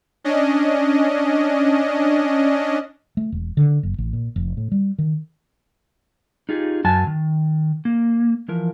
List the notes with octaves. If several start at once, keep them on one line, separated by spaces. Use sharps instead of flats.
C#4 D4 D#5
A3
E1
D3
F#1
A1
A#2
F1
A2
G3
D#3
D#4 F4 G4 G#4
F#2 F#3 G#5 A5
D#3
A#3
E3 F3 A#4